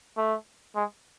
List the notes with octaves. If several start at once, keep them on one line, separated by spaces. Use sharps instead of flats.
A3
G#3